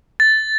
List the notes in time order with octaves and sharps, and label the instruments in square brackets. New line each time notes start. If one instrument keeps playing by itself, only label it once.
[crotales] A6